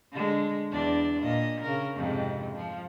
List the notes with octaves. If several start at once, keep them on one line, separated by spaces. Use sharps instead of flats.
D3 G#3
E2 D4 D5
A#2 D#5
C#3 A#4
F2 G#2 C3
F3